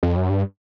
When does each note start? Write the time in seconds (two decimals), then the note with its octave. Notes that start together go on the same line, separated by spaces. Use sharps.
0.03 F2
0.16 F#2
0.30 G2